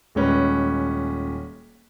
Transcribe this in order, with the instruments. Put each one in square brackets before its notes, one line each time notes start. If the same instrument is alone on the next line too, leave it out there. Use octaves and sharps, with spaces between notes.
[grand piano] D#1 G#3 C#4 B4